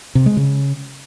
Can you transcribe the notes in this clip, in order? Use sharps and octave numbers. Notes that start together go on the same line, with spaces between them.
C3
G#3
C#3